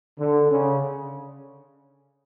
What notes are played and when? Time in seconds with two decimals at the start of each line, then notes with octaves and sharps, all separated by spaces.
0.19 D3
0.51 C#3